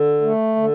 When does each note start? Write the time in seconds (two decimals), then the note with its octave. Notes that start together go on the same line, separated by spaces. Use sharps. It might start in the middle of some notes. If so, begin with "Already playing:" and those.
Already playing: D3
0.22 A3
0.56 D3